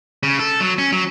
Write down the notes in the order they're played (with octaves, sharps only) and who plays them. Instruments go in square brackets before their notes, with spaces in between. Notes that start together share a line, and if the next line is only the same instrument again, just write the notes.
[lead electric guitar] C#3
A4
F#3
C#4
F#3